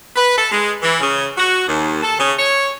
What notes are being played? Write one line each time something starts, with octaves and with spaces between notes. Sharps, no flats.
B4
A4
G#3
E3
C#3
F#4
D#2
A4
C#3
C#5